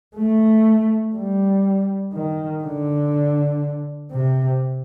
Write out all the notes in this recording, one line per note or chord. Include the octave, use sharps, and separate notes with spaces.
A3
G3
D#3
D3
C3